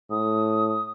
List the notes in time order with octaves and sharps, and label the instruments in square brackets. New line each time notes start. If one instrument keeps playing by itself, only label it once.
[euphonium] A2 [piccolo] D#6